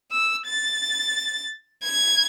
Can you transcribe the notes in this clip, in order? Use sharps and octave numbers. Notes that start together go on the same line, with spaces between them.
E6
A6
G#6